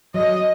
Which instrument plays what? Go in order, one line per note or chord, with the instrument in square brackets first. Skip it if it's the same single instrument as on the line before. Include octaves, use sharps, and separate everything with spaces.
[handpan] F#3 [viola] D#5